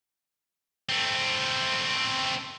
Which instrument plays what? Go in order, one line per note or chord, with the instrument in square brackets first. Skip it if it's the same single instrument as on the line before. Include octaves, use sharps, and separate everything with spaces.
[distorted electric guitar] A3 C4